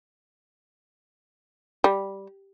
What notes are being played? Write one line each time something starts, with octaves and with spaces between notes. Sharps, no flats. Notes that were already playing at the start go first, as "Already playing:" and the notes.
G3